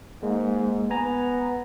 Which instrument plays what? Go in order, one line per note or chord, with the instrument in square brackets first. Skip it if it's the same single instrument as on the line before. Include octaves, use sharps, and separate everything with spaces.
[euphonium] G#2 [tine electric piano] G#3 A#3
[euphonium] B3 [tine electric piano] G#5 A#5